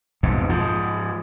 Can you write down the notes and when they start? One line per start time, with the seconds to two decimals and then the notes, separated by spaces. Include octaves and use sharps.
0.23 B1 F2 G#2
0.49 G#2 F3